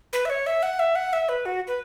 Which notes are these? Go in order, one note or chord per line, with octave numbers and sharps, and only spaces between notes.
B4
E5
C#5
E5
F#5
E5
F#5
E5
B4
F#4
B4